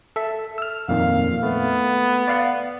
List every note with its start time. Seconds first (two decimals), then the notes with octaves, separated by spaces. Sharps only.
0.16 A4 E5
0.58 E6 F6
0.89 F2 A#2 D#3 F5
1.43 A3 B3
2.28 D5 F5 F#5